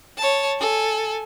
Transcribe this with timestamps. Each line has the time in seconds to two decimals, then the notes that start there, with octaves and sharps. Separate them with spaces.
0.18 C#5 A5
0.59 A4 G#5